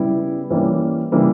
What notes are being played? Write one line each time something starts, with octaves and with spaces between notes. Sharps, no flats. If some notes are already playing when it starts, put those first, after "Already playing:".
Already playing: C#3 G3 B3 E4
E3 G3 A#3 C#4
C#3 E3 G3 A#3